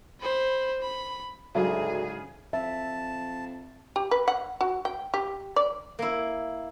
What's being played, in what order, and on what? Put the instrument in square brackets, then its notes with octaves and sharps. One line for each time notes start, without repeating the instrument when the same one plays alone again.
[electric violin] C5 B5
B5
[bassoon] D2 [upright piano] G#2 C#3 [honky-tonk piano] F#3 E5 [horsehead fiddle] G#4
[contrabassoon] F2 [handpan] E5 [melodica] A5
[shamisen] G4
B4
F#5
F#4
G5
G4
D5
[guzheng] A#3 E4